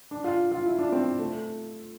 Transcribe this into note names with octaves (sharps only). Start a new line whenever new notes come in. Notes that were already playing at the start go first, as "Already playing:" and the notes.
D4
F4
F4
E4
D4
C4
A3